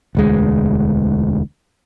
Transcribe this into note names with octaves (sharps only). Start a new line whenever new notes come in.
E1 D2 G#3